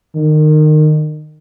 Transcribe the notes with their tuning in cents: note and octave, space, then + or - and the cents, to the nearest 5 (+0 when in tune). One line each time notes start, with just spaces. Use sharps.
D#3 -25